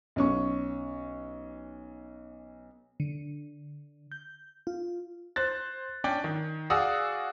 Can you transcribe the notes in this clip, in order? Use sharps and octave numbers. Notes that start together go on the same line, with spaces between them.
B1 C#4 C#6
D3
G6
F4
C5 F#6 A6
C#4 D4 D5 G5
D#3
F#4 G#4 D5 F5 D#6 E6